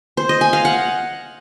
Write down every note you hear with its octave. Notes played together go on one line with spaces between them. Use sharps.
C5
D#5
G#5
F5
F#5